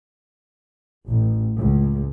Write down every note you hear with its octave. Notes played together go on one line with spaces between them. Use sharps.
A1
C#2